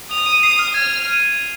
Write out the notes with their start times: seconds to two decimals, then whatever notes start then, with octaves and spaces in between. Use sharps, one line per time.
0.11 D#6 F7
0.26 D#7
0.43 C7
0.59 F6
0.74 F6 G#6
1.07 D#7